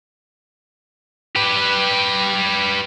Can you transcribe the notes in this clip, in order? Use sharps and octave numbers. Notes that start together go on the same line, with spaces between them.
G4 B4